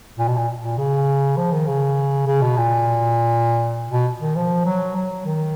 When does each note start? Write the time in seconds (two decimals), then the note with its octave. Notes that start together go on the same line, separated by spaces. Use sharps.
0.18 A#2
0.28 B2
0.37 A#2
0.62 A#2
0.78 C#3
1.37 F3
1.53 D#3
1.67 C#3
2.27 C#3
2.42 B2
2.57 A#2
3.91 B2
4.20 D#3
4.36 F3
4.66 F#3
4.96 F#3
5.25 D#3